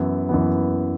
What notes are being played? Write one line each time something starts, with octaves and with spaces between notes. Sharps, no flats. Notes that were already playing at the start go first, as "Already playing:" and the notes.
Already playing: F#2 E3 B3 E4
F#2 E3 B3